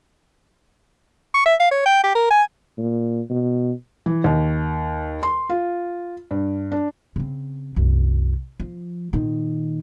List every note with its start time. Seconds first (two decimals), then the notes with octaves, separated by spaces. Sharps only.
1.34 C#6
1.46 E5
1.60 F5
1.72 C#5
1.86 G5
2.04 G4
2.15 A#4
2.31 G#5
2.78 A#2
3.30 B2
4.06 E3
4.24 D#2
5.23 C6
5.49 F4
6.31 G2
6.72 D4
7.16 C#3 C4
7.76 C2 F#2
8.60 F3
9.13 A#2 D#3